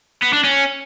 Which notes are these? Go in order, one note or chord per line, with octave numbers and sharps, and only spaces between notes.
B3
D4
C#4